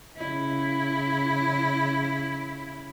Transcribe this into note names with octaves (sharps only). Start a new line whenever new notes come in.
C#3 E4